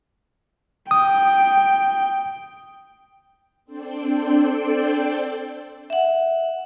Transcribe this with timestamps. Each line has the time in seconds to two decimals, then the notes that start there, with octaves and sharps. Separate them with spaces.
0.91 G5 D#6
3.65 C4 D4 A4 C5 D5 G5
5.90 E5 F#5